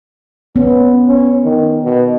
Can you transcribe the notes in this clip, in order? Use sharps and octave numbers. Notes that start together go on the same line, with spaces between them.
B3 C#4
C#4
D#3
B2